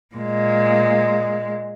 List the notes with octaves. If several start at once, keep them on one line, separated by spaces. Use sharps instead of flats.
A#2 G#3